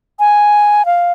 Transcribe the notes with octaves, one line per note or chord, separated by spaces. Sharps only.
G#5
F5